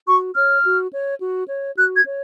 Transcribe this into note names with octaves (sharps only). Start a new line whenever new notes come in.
F#4 C#6
C#5 F6
F#4
C#5
F#4
C#5
F#4 F#6
G#6
C#5